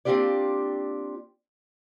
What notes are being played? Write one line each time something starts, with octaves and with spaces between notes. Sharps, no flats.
A#3 C4 D4 F4 G4 D5